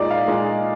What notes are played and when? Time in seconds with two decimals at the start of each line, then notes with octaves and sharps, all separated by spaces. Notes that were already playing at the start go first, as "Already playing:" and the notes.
Already playing: A#2 G#3 D#4 D5
0.10 F5
0.28 A#2 G#3 D#4